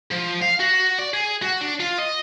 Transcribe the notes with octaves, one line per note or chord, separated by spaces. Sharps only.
F3
F5
F#4
D5
G#4
F#4
D4
F4
D#5